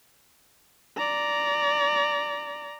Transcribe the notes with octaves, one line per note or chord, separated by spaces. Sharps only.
D5 A#5